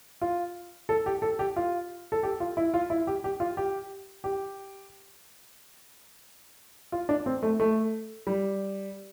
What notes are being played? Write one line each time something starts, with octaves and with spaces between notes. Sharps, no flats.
F4
A4
G4
A4
G4
F4
A4
G4
F4
E4
F4
E4
G4
G4
F4
G4
G4
F4
D4
C4
A3
A3
G3